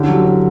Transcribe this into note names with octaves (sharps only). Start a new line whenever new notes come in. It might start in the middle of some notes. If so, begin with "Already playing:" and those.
Already playing: D3 C#4 E4 G4
F#3
D3